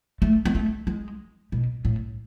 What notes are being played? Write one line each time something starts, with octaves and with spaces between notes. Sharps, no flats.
A3
B3
A3
G#3
B2
A2